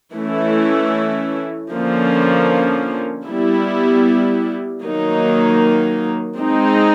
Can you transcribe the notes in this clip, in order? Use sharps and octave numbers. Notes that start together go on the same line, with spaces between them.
E3 A3 C#4 E4
D3 F3 A#3 C#4
G3 B3 E4
D#3 F#3 A#3 D#4
G#3 C4 D#4